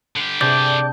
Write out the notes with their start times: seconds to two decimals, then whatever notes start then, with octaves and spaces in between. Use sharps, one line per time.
0.16 D3 G4
0.41 C3 D4 G#4 D5 G6